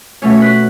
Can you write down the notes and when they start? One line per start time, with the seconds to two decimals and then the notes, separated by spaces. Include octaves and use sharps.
0.22 B2 A3 C#4 C#5
0.33 C#5
0.42 B4